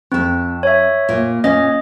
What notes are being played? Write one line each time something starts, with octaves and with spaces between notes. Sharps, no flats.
F2 C4 A4
C#5 E5
A#2
A#2 C#4 D#5